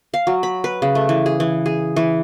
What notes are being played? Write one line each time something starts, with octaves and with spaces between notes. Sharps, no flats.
F5
F#3
B5
B4
C#3
A3
E3
G#4
E3
G#4
E3